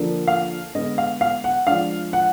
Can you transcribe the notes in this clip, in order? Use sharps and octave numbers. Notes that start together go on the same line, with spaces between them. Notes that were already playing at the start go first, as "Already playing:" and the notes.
Already playing: D3 F3 A#3 D4
F5
D3 G#3 B3 D#5
F5
F5
F#5
F3 G#3 D4 F5
F#5